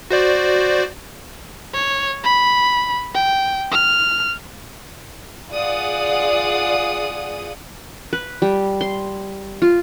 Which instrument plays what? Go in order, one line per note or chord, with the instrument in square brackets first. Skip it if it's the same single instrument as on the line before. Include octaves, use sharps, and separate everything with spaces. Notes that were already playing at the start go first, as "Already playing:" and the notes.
[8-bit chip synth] F#4 C5 D5
[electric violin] C#5
B5
G5
F6
[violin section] F4 G#4 D5 F#5 D#6
[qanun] B4
G3
C6
F4